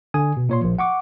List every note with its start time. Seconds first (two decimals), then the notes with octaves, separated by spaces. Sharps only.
0.14 D3 G#5 D#6
0.37 B2
0.49 A#2 C#5 C6
0.61 A#1 F3
0.79 F#5 C#6 D6